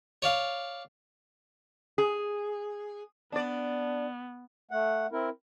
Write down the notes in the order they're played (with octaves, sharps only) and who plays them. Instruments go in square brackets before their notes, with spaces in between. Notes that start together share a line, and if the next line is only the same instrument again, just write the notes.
[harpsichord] C#5 D5 F5
[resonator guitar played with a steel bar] G#4
[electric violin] B3 [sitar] D4 D5
[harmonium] A3 F#5
C4 E4 A#4